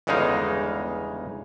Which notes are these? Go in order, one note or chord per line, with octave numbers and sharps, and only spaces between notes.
G1 E2 C#3 G#3 D#4 F5